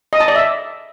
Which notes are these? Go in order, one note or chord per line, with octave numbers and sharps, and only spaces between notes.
D#5
A5
D5
E5